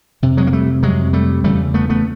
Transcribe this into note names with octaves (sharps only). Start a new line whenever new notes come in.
F2 C3
F#3 G#3
A#3
G3 A3
F2 C3 F#3 G#3
G3 A3
E2 C#3 G3 A3
A3 B3
A3 B3